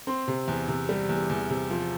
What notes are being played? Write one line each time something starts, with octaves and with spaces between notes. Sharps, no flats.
C4 C6
C3
E2
C3
G3
E2
E2
C3
F3